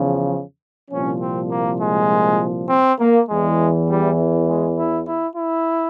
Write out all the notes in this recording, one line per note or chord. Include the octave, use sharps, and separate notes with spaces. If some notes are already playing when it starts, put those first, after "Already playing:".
Already playing: E2 C#3 F3
C2 A#2 F3 C#4
C4
A#3
G#3
C4
A#3
E2 E3 G#3
G3
G#3
E4
E4
E4